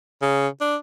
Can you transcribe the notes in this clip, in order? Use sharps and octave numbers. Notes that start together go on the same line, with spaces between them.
C#3
D4